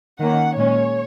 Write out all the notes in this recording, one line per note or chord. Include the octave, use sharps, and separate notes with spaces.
D#3 A#3 C#4 F#5
A#2 G#3 C#4 C#5